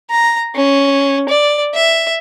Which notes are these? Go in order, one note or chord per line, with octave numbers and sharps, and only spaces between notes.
A#5
C#4
D5
E5